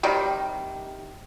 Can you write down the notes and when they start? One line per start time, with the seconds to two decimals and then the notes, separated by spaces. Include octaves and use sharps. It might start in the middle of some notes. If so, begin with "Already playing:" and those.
0.03 C3 D#3 G3